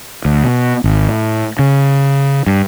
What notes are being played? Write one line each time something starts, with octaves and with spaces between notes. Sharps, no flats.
D2
B2
G#1
A2
C#3
G2